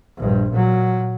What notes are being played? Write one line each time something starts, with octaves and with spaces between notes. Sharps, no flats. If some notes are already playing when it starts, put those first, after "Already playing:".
A#1 G2
A#2 F#3